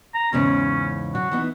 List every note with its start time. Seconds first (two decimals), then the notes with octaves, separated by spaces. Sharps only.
0.14 A#5
0.33 E2 G#2 C#3 C#4
1.15 F#3 F#4
1.32 E3 B3 D#4